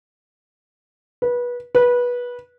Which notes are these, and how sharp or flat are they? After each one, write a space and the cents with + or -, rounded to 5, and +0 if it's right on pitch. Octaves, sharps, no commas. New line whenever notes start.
B4 -25
B4 -20